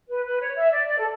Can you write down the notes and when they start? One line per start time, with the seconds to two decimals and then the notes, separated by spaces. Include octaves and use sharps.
0.09 B4
0.24 B4
0.40 C#5
0.56 E5
0.71 D5
0.86 D5
0.98 A4